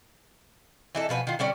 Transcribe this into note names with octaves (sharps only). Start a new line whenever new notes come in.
E3 D#4 A4
B2 F3 B4 G#5
D#3 F4
D3 G3 C#4 D5